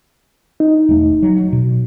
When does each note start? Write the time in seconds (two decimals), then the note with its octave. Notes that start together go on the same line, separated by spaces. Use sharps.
0.60 D#4
0.89 E1 A3
1.23 F#3
1.53 B2